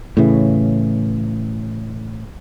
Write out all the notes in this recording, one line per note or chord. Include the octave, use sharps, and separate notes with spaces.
A2 C#3 E3